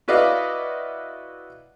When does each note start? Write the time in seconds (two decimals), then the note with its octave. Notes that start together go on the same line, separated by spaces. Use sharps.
0.08 E4 F#4 B4 D5 D#5 F5